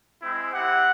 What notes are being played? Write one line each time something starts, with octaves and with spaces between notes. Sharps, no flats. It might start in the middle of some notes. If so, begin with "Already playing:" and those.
G#3 C4 E4
C4 E4 G4 F#5